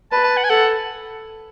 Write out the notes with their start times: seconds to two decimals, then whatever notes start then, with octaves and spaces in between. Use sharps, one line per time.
0.12 B4 A5
0.24 A5
0.37 F#5
0.44 G#5
0.50 A4 F#5